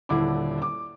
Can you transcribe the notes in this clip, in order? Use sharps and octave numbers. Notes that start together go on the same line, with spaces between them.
D#1 D3 D4 E4 D5 D6
D6